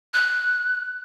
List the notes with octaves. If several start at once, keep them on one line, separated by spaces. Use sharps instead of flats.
F#6